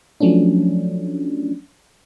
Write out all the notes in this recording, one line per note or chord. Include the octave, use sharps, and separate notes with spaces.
F3 F#3 A3 C#4 D4